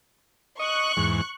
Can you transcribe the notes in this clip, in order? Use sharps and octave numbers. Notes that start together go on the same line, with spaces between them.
D#5 C#6 F#6
E2 G#2